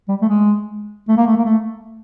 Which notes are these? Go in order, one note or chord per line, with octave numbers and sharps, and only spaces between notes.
G3
A3
G#3
A3
A#3
A3
A#3
A3